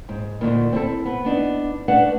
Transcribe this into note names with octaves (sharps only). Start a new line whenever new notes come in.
G#2
D2 A#2 D#3
C4 E4 A4
B3 B4
B3 D4 D#4
A3 D4 B4 F#5